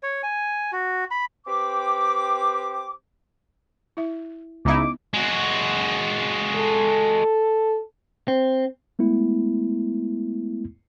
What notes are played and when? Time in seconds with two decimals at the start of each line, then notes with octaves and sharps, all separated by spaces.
0.03 C#5
0.23 G#5
0.72 F#4
1.11 B5
1.45 C4 G4 B4 D6
3.97 E4 E5
4.65 C#2 B3 D#4 E4 D6
5.14 G#3 F#4
6.56 A4
8.28 C4
8.99 G#3 A3 B3 E4